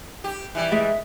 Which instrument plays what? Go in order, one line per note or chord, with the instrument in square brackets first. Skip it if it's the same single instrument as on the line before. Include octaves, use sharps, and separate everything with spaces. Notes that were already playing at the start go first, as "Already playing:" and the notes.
[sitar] G4
E3 G3
[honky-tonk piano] G#3 [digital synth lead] E5